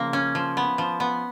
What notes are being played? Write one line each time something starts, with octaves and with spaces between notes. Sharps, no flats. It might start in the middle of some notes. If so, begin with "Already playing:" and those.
Already playing: C#3 F3 A#3
C#4
F3
B3
F3
B3